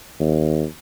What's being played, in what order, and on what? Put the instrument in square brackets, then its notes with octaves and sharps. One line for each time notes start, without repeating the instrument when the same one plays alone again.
[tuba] D#2